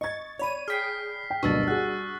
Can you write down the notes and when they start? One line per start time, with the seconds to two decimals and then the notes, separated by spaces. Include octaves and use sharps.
0.01 D#5 C#6 G#6 A6
0.39 C#5 D5 B5 D#7
0.68 G#4 G5 F6 B6 C7
1.30 G5
1.43 F#1 D2 B2 G3 D4 C#6 E6 A6
1.68 F#4 G#4 E6 F#6